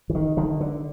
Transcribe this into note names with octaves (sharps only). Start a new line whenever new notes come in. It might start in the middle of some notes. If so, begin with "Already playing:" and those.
E3
D#3
D3 D#3
D3